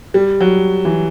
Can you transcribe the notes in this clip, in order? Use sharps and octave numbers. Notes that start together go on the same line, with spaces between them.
G3
F#3
E3